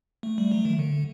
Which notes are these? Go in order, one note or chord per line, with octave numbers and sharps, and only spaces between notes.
A3
G3
F#3
D#3
D3